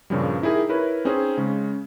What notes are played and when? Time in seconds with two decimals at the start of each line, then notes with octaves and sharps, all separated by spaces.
0.10 G2 A#2 C#3 F3 G3
0.42 D#4 E4 G4 G#4 A#4
0.69 E4 A#4 B4 C#5
1.05 C4 C#4 D#4 G#4 C5
1.37 C#3 G#3 C#4